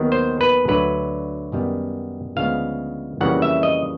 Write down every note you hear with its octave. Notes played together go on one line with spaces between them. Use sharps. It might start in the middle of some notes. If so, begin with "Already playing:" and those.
Already playing: D#2 D#3 F#3 B3
C5
B4
D2 D3 F#3 B4
F#2 D#3 G3 B3
D2 C#3 F3 G#3 B3 F5
F2 C#3 E3 G3 A#3 F#5
E5
D#5